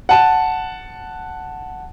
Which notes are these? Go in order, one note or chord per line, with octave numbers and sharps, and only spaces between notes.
F#5 A5